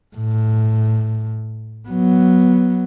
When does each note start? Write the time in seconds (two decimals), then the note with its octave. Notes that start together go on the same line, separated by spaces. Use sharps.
0.16 A2
1.88 F#3 B3